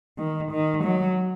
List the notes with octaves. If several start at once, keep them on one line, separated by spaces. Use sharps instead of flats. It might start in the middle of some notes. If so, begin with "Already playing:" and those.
D#3
D#3
F#3